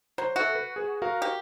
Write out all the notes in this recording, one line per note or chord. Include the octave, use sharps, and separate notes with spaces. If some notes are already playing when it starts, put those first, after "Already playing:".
F#3 C5
F#4 A4 E5 F#5
B4
G#4 B4
F#4 A#4 F5
G4